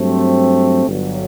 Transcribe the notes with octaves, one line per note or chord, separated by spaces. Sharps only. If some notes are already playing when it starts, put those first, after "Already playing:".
Already playing: G2 F#3 A3 C4
G1 G2 F#3